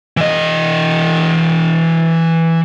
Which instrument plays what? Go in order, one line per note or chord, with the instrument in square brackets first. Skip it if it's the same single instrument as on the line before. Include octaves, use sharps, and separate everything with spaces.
[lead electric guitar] E3 D#5